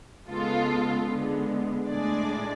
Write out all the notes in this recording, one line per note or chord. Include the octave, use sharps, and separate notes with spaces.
C#3 G#3 B3 F4 A4
D3 G#3 B3
A2 G#3 D4 G#4 D5